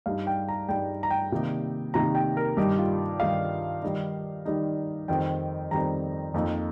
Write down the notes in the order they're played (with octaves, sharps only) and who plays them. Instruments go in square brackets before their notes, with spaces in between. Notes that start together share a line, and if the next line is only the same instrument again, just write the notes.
[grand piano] G2 G3 D#4 F5
G5
A#5
G2 G3 D#4 G5
A#5
G5
C3 D#3 A#3 D#4
C3 D#3 A#3 D#4 A#5
G5
A#4
G2 D#3 G3 D#4 G4
F4
G2 D#3 G3 D#4 F5
D#3 G3 D#4
D#3 G3 D#4
F2 D#3 G3 C4 D#4 G5
F2 D#3 G3 C4 D#4 A#5
F2 F3 A#3 D#4